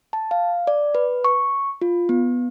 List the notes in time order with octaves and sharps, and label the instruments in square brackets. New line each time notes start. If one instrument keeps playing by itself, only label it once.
[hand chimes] A5
F5
D5
B4
C#6
F4
B3